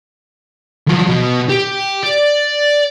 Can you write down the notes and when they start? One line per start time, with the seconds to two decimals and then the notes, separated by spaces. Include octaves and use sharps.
0.87 F3 F#3
1.07 B2
1.50 G4
2.03 D5